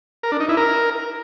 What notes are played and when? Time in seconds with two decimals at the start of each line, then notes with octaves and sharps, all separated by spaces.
0.23 A#4
0.32 D4
0.40 D#4
0.49 E4
0.57 A#4